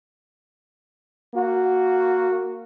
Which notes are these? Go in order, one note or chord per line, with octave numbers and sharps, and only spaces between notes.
A#3 F#4